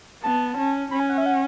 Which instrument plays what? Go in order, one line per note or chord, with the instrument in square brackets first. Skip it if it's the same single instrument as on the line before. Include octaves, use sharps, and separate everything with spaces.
[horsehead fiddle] B3 [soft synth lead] A5
[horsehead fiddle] C#4
[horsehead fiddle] C#4 [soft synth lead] B5
[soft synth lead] G#5
F#5
E5
F#5